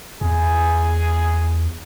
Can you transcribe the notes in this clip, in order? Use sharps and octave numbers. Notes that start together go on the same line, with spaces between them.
E2 G#4